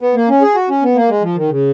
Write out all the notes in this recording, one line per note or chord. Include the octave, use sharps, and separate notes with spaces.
B3
A#3
C#4
G#4
F#4
C#4
B3
A#3
G#3
F3
D#3
C#3